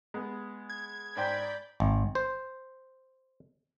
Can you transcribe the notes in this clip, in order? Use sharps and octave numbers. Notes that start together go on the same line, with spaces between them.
G#3 B3
G#6
G#2 C5 D5 G5 B5 G6
G#1
C5